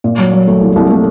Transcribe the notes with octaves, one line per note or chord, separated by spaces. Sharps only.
A#2
F#3
F#3
A3
C2
C2
A3